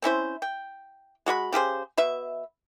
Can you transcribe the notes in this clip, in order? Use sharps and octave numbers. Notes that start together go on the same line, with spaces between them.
C4 C#4 E4 C5
G5
G#3 F#4 D5 B5
C#3 G4 G#4 C5
B2 B4 E5